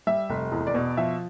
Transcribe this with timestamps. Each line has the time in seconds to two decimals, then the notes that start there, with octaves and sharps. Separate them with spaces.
0.07 G3 E5
0.30 F1
0.52 E2
0.67 D5
0.75 B2
0.97 F3 E5